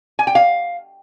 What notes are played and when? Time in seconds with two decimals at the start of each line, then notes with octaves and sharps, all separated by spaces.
0.19 G#5
0.27 G5
0.35 F5